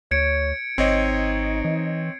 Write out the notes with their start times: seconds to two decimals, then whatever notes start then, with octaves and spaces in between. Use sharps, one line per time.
0.11 D2 C#5 G#6 C#7 D7
0.78 G#1 C4 D#4 C#5 D#5 C7
1.65 E3